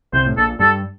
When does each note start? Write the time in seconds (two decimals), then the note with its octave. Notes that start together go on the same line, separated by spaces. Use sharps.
0.13 C2 C3 C5
0.26 A2
0.37 A#1 A#2 A4
0.59 G2 G3 A4